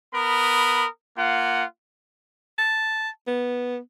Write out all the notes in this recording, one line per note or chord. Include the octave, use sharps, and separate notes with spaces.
B3 A#4 B5 D#6
A#3 F4 F#5
A5
B3